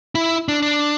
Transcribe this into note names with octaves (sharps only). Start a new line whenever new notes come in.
E4
D4
D4